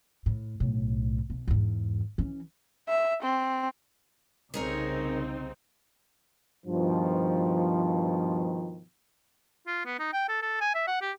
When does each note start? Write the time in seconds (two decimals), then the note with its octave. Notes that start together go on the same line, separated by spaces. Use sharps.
0.26 A2
0.60 B1 A2
1.30 B1
1.47 E2 G#2
2.18 E3 C#4
2.88 E5
3.22 C4
4.54 C2 C#3 C4 D#4 G#4 A#4 C#5
6.66 G2 B2 D#3 F3
9.67 F4
9.85 B3
9.99 D#4
10.13 G5
10.29 A4
10.42 A4
10.61 G#5
10.75 E5
10.88 F#5
11.01 G4